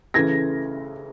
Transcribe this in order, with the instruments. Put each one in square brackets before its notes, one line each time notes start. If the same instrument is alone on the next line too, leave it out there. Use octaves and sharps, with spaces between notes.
[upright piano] C#3 E3 A3 G#6 A#6